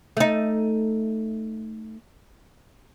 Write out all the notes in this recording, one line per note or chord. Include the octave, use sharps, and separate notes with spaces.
A3 D#4